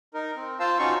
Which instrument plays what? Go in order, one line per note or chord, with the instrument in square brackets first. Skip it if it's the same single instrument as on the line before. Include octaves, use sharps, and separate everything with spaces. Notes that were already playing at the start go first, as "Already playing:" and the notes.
[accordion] D#4 A#4
C4
F4 C5 F5 A5 E6
C#4 D#4 F4 F#4 F5 C#6